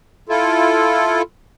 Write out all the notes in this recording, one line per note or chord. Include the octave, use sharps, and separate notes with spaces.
E4 F4 A4